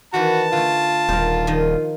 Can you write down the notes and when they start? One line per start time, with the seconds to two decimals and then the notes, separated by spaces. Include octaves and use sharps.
0.14 D#3 E3 F#4 B4 A5
0.53 D3 A3 F4
1.09 D#1 A#4 C5
1.47 D#3 F3 D#5